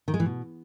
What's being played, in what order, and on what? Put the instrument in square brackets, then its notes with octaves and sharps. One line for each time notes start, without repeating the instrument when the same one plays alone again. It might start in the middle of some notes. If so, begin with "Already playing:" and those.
[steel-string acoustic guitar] D#3
G#3
E3
B2